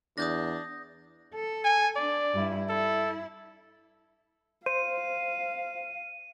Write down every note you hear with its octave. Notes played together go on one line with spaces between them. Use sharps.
E2 D4 D#6 G6 A#6
A4
G#5
D4 D5
G2 E4
E4 A4
C5 F5 D#7